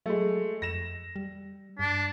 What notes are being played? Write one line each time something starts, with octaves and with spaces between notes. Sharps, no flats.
F#3 G#3 A3
F2 A#6 E7
G3
G2 D4